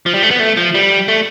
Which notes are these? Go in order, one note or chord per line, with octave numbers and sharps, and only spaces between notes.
F3
G3
A3
B3
A3
F3
G3
A3